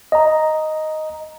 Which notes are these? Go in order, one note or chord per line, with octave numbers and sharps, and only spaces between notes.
D#5 A#5